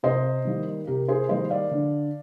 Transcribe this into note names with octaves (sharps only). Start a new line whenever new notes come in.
C3 C5 D#5
D#3 G3 A#3
C3 G4 A#4
G#4 C5
D#3 G3 A#3 C5 D#5
D5 F5
D3